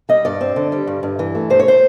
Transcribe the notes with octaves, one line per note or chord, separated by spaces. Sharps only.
G3 D#5
G2 D5
C4
D3
G3
G2
G2
E3
A3
G2 C5
C#5
C5